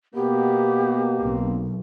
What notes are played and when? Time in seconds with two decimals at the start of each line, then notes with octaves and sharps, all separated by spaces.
0.14 B2 A#3 B3 G4
1.23 B1 C4